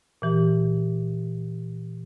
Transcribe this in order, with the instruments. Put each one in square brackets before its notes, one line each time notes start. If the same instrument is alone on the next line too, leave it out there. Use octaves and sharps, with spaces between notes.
[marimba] A#2 E3 G4